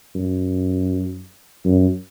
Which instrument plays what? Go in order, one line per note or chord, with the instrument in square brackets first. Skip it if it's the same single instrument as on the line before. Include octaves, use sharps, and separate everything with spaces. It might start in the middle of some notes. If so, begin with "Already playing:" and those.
[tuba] F#2
F#2